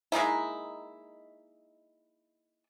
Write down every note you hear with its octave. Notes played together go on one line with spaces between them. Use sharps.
G#3 A#3 D#4 E4